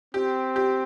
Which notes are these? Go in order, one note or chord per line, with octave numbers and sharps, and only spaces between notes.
C4 G4
G4